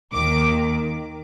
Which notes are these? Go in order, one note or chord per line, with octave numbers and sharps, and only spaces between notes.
D#2 D#3 D6